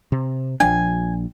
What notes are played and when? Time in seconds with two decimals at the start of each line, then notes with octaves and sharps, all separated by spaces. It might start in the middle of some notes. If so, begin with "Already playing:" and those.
0.12 C3
0.60 A#1 F3 D4 G#5